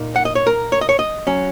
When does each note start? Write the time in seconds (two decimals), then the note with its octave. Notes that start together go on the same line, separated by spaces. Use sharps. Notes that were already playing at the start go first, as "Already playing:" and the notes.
Already playing: A#2 A#3 D#4
0.16 F#5
0.25 D#5
0.35 C#5
0.47 A#4
0.72 C#5
0.81 D#5
0.89 C#5
0.99 D#5
1.27 F#3 C#4